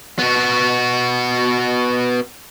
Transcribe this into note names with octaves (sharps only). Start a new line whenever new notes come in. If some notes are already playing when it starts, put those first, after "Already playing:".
B3 F#4